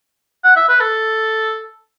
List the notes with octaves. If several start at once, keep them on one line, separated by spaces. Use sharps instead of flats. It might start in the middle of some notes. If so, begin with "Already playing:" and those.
F#5
E5
B4
A4